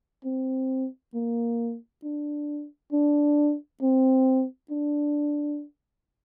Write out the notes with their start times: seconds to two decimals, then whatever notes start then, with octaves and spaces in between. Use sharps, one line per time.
0.25 C4
1.14 A#3
2.04 D4
2.93 D4
3.82 C4
4.71 D4